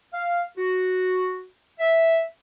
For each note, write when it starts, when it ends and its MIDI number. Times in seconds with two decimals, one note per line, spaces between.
0.12 0.42 77
0.58 1.46 66
1.79 2.22 76